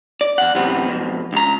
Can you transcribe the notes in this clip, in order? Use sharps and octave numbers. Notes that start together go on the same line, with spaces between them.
D5
E2 F#5
F#2 C3 E3 B3 C4
F2 B2
C#2 A#5